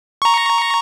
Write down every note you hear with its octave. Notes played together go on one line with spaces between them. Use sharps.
A#5 C#6